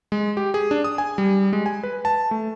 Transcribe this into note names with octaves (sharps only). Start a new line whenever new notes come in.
G#3
G4
G#4
D4
D#6
G#5
G3
G#3
G#5
B4
A5
A3